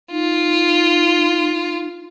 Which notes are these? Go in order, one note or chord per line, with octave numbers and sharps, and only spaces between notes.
D#4 F4